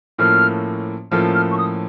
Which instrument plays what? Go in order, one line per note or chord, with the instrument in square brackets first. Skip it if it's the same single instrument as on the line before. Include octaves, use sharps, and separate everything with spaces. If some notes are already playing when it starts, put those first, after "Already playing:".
[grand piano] A2 F3 A#3 C#4 A4 [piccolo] F6
[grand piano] A2 F3 A#3 C#4 A4 [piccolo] F6
[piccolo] F6
C#6
D#6